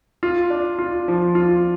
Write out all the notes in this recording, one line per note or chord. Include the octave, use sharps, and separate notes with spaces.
F4
D4
F4
F3
F4